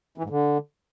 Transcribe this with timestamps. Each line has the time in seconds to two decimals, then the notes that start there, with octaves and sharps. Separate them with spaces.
0.18 E3
0.24 G#2
0.30 D3